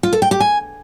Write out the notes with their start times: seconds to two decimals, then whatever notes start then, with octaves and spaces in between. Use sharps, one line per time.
0.03 F4
0.13 A4
0.22 G5
0.31 G4
0.40 G#5